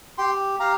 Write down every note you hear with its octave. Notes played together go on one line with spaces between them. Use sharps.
G4 G5 C6
G4 F5 A#5